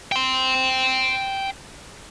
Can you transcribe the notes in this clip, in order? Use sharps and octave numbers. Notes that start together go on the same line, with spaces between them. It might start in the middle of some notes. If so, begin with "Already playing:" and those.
G5 C6